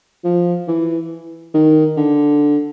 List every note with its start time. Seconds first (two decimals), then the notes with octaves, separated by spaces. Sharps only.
0.24 F3
0.67 E3
1.54 D#3
1.97 D3